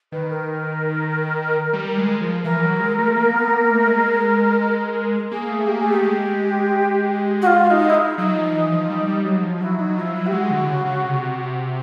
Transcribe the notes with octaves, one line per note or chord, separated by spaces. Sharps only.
D#3 B4
A#4
G3
G#3
F3
E3 A#4
F#3
G#3
A3
A#3
B3
A#3
A3
G#3
A#3 G#4
A3
A#3 G4
A3 G#4
G4
G#3
F#4
F4
D#4
E4
D#4
F#3 D#4
F3
E3
F3
G3
G3
F#3
F3
F#3 E4
F#3 D#4
F3 E4
F#3 E4
G4
G#3 F#4
D3
C#3
C#3
C3